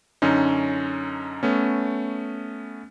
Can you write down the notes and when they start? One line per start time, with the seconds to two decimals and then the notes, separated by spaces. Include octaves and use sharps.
0.22 F#2 D3 C#4 D#4
1.43 A3 B3 C#4